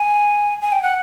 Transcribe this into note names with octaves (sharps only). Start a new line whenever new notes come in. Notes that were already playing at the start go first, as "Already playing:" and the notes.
Already playing: G#5
G#5
G5
F#5